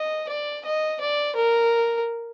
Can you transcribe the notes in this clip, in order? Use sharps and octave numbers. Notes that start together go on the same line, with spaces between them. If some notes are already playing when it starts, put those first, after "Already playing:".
Already playing: D#5
D5
D#5
D5
A#4